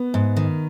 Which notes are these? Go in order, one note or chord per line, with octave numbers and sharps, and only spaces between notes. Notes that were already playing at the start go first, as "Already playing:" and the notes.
Already playing: B3
G#2
D#3